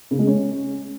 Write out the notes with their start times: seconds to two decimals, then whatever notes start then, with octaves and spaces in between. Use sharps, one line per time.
0.11 C#3
0.19 G#3
0.27 C#4